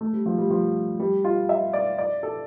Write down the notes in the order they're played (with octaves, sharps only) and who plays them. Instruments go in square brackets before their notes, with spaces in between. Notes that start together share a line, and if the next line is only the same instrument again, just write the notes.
[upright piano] A3
G3
F3
G3
F3
G3
F4
E5
D5
D5
A4